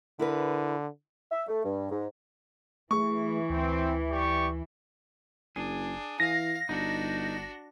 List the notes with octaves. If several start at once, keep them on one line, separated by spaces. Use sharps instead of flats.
D3 E4 A#4 B4
E5
A3
G2
G#2
E3 A3 G#4 C#6
D2 C4
G4 D5 C#6
F#1 D4 G#4
E3 F5 A#6
G1 D4 D#4 F#4